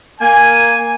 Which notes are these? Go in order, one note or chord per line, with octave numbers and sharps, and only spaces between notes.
A#3 G#5